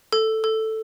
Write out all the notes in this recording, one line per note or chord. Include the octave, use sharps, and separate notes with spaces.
A4
A4